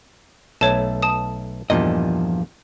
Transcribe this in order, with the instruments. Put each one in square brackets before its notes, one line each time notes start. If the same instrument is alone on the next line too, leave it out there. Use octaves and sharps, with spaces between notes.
[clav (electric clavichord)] B1 A3 [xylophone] C#5 A5
[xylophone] A5 D#6
[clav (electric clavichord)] E2 G2 A#2 [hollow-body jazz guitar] F3 D#5